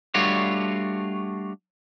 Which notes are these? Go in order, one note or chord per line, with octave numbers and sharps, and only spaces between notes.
G3 A3 D4 F4 F#4 C#5